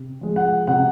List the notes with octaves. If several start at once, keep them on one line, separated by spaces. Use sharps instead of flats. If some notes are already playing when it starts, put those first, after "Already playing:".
Already playing: C3
F3 G#3
F#5
C3 F#5